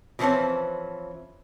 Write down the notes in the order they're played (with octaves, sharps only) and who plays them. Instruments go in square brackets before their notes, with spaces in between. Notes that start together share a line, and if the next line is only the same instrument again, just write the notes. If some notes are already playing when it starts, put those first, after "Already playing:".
[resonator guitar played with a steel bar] B2 E3 F3 C4 C#4